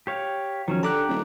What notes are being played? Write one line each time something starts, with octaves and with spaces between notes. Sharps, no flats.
G4 C#5 F5
D#3 F3 F#3 C#4
D3 D4 G4 F#5 A#5 D6 F#6
D#1